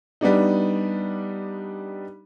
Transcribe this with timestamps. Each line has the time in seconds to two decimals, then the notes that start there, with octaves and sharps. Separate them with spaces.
0.21 G3 B3 D4 D#4